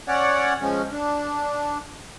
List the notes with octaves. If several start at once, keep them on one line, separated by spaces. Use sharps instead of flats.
C#4 C#5 D5 F#5
F3 G#3 C#4
D4